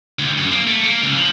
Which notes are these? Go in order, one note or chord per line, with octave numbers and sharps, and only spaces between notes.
D2
F#2
A#3
A3
A#3
C#2
F3